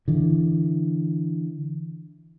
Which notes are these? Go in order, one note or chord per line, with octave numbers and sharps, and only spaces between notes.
D3 E3